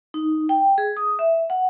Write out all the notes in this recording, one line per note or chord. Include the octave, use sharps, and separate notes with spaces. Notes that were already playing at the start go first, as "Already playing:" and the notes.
D#4
G5
G#4
D#6
E5
F#5